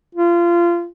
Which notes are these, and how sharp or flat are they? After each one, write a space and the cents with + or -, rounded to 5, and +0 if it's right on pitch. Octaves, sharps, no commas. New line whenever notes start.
F4 -25